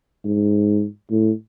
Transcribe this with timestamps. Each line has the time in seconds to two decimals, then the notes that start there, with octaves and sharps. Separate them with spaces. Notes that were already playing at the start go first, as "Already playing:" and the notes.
0.25 G#2
1.11 A2